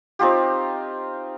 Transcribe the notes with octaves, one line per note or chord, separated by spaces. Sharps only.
C4 D#4 F4 G4